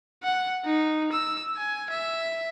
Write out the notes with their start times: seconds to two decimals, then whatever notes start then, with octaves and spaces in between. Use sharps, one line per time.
0.23 F#5
0.65 D#4
1.12 E6
1.57 G#5
1.90 E5